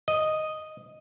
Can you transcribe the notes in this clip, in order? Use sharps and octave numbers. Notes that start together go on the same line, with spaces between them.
D#5